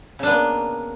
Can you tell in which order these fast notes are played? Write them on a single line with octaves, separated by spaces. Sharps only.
C#3 D4 B3 A#3